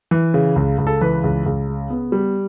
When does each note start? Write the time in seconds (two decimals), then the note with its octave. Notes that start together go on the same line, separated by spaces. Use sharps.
0.11 E3
0.34 C#3
0.56 C#2
0.78 C#2
0.87 A4
1.01 E3 B4
1.24 C#2
1.46 C#2
1.68 C#3
1.90 B3
2.12 G3